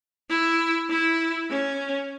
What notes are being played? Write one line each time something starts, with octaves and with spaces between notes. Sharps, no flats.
E4
E4
C#4